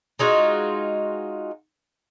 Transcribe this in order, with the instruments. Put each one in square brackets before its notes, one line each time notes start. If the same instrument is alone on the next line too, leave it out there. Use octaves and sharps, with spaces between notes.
[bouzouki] G#3 D#4 F4 F#4